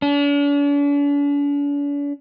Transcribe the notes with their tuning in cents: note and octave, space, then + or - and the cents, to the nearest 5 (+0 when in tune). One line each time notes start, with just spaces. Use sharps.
D4 -45